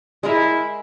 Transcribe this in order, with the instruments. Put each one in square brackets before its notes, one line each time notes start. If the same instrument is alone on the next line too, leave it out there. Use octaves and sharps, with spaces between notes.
[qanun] G#3 G#4 A#4 [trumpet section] E4